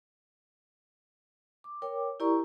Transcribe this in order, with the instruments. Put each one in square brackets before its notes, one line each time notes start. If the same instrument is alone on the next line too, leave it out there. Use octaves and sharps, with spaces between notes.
[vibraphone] D6
A#4 C#5 G5 D6
E4 G4 A#4 D5 A#5 C#6